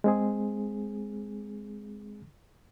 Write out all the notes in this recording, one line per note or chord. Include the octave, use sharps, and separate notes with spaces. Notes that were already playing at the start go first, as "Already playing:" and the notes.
G#3 C4 G#4